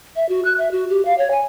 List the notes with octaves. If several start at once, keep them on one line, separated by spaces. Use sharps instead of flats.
E5
F#4
F#6
E5
F#4
G4
F5
C#5
G#5